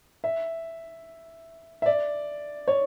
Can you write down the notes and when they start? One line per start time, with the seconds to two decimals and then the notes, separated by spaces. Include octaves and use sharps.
0.24 E5
1.82 E5
1.86 D5
2.68 C#5